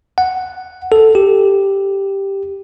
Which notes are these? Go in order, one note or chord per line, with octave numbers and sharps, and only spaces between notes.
F#5
A4
G4